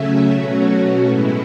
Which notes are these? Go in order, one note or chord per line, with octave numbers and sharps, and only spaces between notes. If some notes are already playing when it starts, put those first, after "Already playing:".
Already playing: C#3 F#3 A3 C#4 E5
B2 F#3 A3 C#4 F#4
A2 G#3 B3 E4